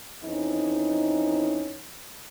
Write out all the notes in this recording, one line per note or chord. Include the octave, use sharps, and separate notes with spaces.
F2 E3 C#4 D#4